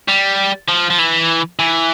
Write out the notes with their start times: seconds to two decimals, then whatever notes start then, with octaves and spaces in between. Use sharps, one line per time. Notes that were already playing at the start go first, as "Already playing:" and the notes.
0.08 G3
0.68 F3
0.90 F3
0.99 E3
1.59 E3